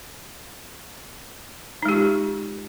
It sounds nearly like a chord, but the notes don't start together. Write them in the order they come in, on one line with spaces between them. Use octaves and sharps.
D#4 G#3 G4 F4